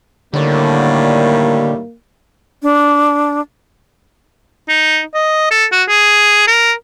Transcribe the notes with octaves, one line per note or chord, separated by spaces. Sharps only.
A2 D3 D#3 G3 A#3
D4
D#4
D#5
A4
F#4
G#4
A#4